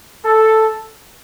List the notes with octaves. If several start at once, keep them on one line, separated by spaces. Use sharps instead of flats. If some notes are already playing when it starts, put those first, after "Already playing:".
A4